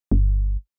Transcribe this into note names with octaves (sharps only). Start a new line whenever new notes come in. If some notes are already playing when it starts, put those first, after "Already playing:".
G1